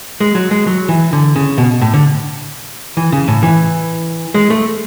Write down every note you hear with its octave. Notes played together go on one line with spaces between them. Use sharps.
G#3
F#3
G#3
F#3
E3
D3
C#3
B2
A2
D3
E3
C#3
A2
E3
G#3
A3